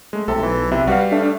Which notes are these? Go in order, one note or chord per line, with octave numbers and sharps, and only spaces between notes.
G#3 A3
B1 C3 A4
E3
C3 E4
G3 F#4 B4 F5
A3 D4